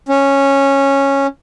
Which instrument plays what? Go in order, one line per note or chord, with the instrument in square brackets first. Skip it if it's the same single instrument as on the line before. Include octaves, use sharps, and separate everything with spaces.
[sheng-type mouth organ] C#4